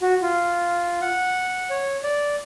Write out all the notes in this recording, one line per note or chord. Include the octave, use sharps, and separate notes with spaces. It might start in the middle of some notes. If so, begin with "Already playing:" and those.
F#4
F4
F#5
C#5
D5